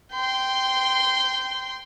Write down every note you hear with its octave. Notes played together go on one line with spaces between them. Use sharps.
G5 C6